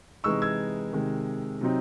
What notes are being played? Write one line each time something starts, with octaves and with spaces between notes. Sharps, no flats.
C3 E3 G#3 D#4 C#6 E6
E6 G#6
C3 D#3 G#3
C3 F#3 C4 D#4